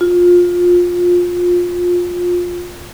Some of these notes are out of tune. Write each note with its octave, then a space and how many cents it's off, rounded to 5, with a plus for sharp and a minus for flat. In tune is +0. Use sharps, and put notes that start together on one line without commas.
F4 +20